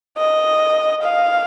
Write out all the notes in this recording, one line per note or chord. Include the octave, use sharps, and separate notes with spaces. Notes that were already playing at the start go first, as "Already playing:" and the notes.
D#5
F5